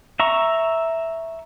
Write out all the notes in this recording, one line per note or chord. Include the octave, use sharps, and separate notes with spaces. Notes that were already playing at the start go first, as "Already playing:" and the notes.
E5 A#5 C#6